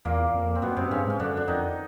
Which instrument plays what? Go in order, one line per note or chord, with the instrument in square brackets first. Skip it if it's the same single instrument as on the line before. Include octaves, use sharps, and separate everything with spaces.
[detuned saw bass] E2 [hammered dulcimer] A#2 A#3
[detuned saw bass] F2
[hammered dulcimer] C4
[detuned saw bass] F#2 [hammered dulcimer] B2 B3
[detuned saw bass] F#2 [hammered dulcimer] C3 C4
[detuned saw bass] G2 [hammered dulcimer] C#3 C#4
[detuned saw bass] G#2 [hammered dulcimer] C#4
[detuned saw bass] F#2 [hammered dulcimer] D3 D4
[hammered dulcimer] D4
[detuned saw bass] F2 [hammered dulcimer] D#3 D#4